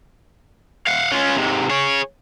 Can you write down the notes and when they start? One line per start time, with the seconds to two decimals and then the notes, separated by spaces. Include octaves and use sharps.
0.87 F5 F#5
1.11 C#4 F4
1.36 G#2 C3
1.70 G#4 C#5